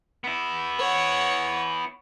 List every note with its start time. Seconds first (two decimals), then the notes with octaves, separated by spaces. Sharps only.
0.24 B3 E4
0.79 C#5 F#5